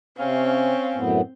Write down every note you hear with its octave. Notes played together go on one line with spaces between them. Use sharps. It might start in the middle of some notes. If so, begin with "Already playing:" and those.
C3 C4 C#4 F5
F#2 A2 B3